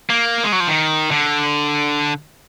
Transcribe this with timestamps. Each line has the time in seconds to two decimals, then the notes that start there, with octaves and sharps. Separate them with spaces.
0.10 A#3
0.44 G#3
0.52 F#3
0.60 F3
0.68 D#3
1.11 D3